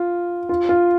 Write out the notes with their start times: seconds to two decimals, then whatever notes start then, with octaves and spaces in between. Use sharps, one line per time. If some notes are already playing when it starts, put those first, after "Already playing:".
Already playing: F4
0.49 F4
0.69 F4